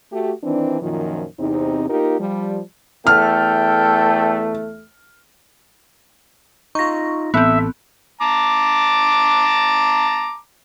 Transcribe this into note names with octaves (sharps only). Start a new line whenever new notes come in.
A3 F#4 G4
D#3 E3 C4 D4
F#2 A#2 D#3 F3
E2 C3 C4 D#4
A#3 D#4 F4 G4 A#4
F3 G3
E2 A3 A4 G5 F6
D#4 F4 C#6 A#6
A1 B3 C4 A4 E5
A5 A#5 D6